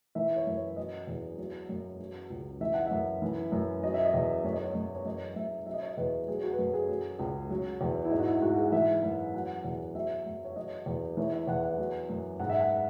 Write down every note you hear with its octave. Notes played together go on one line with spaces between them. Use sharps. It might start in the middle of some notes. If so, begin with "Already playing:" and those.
E3 E5
C#5
F#2
C#5
F#3 D#5
E2
F#3
F#2
F#3
C#2
E3 E5
F#5
F#2 E5
E3
F#2
F#3 D#5
E5
D#5
E2
F#2 C#5
D#5
C#5
F#2
C#5
F#2 D#5
F#2 E5
F#3 E5
D#5
C#5
D#5
E2 B4
F#3 G#4
F#4
B4
F#2 A4
G#4
F#3
C#2
F#3
E2
E4
G#2 D#4
F#4
E4
G#2 F#4
G#4
E3 E5
F#2
F#3 F#5
E2
F#3 E5
F#2
C#5
F#3 D#5
E2
E3 C#5
E5
E2 F#5
F#5
F#3
F#2
G#2 F#5
E5
F#5